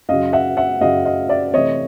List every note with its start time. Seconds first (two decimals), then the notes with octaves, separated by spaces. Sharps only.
0.09 F#2 C#3 F#3 D#5 F5
0.33 E5 F#5
0.57 E5 F#5
0.81 F#2 C#3 F#3 D#5 F5
1.05 D#5 F5
1.29 D5 E5
1.53 C3 E3 A3 C#5 D#5